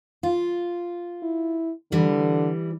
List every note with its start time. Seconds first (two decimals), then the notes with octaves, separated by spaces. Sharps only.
0.23 F4
1.23 E4
1.92 D3 E3 G3